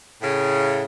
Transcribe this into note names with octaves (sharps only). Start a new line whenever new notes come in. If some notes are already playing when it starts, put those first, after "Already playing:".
A2 C#3